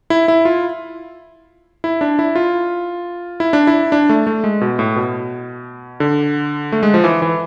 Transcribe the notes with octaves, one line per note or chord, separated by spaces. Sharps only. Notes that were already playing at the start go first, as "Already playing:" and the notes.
E4
E4
F4
E4
D4
E4
F4
E4
D4
E4
D4
A3
A3
G#3
B2
A2
B2
D3
A3
G#3
F3
E3
E3